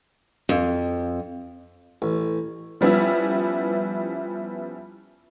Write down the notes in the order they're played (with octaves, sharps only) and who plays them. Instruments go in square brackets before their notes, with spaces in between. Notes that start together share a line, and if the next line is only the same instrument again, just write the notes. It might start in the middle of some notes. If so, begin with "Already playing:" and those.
[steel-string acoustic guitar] F2
[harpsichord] A1
[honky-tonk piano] F3 G3 B3 C#4 E4 E5